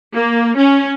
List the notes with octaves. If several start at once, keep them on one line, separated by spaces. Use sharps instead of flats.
A#3
C#4